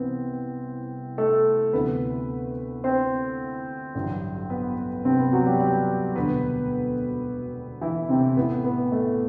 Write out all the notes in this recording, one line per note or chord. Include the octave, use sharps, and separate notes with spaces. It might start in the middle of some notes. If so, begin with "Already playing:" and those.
Already playing: C2 C3 E3 B3 C4 C5
A3 A4
D2 C3 E3 B3 B4
C4 C5
A1 G2 D3 F#3
B3 B4
C3 C4
B3
F#3 F#4
G3 G4
G3 G4
E1 D2 D3 B3 B4
E3 E4
C3 C4
A1 A2 E3 B3
B3
A3